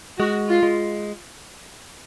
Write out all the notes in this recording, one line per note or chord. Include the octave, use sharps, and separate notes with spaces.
G#3 F#4
F4
G#3